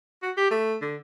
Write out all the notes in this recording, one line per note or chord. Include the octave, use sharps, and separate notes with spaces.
F#4
G4
A3
D3